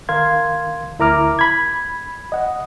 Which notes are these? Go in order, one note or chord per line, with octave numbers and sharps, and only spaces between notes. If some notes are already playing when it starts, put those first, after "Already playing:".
D#3 A#4 F5 C6 G#6
D2 E4 A#4 A#5 D6 F6
B5 G#6
D#5 F#5